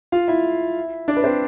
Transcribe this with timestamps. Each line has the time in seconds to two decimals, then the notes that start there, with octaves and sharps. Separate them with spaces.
0.12 F4 F5
0.28 E4 E5
1.08 D4 D5
1.17 B4
1.24 C4 C5